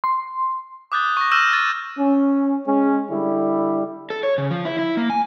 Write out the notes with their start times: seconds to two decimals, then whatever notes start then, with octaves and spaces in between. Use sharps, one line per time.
0.04 C6
0.92 D6 D#6 F#6 G6 A6 G7
1.17 C#6 A#6
1.32 E6 F6 G6 A#6 D#7 E7
1.52 C#6 A6
1.97 C#4
2.66 G#3 C#4
3.09 D3 G3 E4
4.10 A4
4.23 C#5
4.38 C#3
4.51 F3
4.65 E4
4.79 E4
4.97 A#3
5.10 G#5